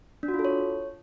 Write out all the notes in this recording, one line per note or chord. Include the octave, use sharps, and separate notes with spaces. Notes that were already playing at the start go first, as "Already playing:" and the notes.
D4
F#4
F4
A4
C#5